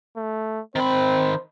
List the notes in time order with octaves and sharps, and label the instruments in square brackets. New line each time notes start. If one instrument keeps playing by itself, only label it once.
[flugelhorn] A3
[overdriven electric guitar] D#3 B5 [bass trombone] C4 [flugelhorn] C5